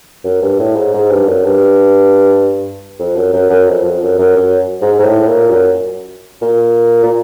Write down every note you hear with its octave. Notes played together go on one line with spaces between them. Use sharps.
F#2
G2
A2
G#2
G#2
G2
F#2
G2
F2
F#2
F#2
F#2
F2
F2
F#2
F#2
F#2
G#2
G#2
A2
A#2
F#2
A#2
A#2